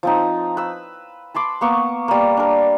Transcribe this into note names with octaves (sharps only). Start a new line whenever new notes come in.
F3 C4 D#4
B4 E6
A5 B5 C6 D6
A#3 B3 C#6 D6
G3 A#3
D4 A#4